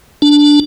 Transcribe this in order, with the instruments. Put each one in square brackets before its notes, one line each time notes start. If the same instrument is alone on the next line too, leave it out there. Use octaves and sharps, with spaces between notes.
[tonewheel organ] D4